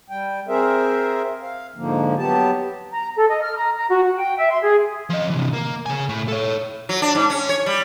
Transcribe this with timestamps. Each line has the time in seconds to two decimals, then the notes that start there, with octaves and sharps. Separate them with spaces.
0.10 G3 G5
0.48 C4 G#4 A#4 C5 E5
1.41 F5
1.76 G#2 D3 F3 A#3
2.18 F#3 B3 G4 A5
2.92 A#5
3.16 A4
3.29 D#5
3.42 F6
3.57 A#5
3.77 A#5
3.90 F#4
4.04 F#5
4.17 G5
4.37 E5
4.51 C6
4.63 G#4
5.10 F3 D#5
5.30 C3 E3
5.53 A#3
5.86 C#3 G#5
6.09 A2
6.28 A4 C#5
6.89 F#3
7.02 D4
7.15 G#2
7.30 C#4
7.49 C#5
7.66 G3